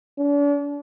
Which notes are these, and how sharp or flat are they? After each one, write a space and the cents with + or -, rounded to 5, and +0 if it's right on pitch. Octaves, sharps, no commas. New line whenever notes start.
D4 -40